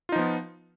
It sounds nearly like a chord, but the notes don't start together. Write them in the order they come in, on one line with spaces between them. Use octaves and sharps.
F4 D#4 F3 B3